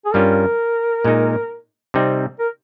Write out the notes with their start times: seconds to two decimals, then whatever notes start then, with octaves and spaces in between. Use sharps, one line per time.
0.06 G#4
0.14 G2 G3 C#4 F4 A#4
1.05 A#2 G#3 D#4
1.94 C3 G3 C4 D#4
2.39 A#4